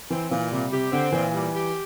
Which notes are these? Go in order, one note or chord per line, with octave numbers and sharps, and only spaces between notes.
E3 C4
A#2 E3
C3 G3
C3 G4
D3 C4
A#2 E3
G3
G4